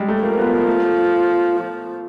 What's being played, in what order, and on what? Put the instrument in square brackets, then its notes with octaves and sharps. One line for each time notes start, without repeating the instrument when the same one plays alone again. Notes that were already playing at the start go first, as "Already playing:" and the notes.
Already playing: [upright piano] G3 G#3
A3
[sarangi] F3 [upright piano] A#3
[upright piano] B3
A#3
A3
A3